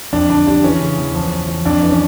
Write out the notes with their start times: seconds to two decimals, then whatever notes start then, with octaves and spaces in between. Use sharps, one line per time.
0.13 F2 D4
0.30 D3 D4
0.46 G3 D4
0.63 E3 C#4
0.81 C#3
0.98 E2
1.14 F3
1.32 F3
1.48 F3
1.65 F2 D4
1.83 E3
1.91 C#4